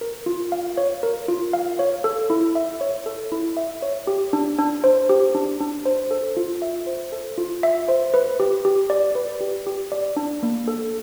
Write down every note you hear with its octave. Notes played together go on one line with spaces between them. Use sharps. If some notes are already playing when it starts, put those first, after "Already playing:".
A#4
F4
F5
C#5
A#4
F4
F5
C#5
A4
E4
E5
C#5
A4
E4
E5
C#5
G4
D4
D4
C5
G4
D4
D4
C5
A4
F4
E5
C5
A4
F4
E5
C5
B4
G4
G4
D5
B4
G4
G4
D5
D4
A#3
A4